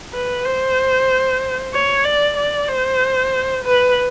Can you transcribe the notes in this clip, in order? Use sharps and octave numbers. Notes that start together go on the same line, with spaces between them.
B4
C5
C#5
D5
D5
C5
B4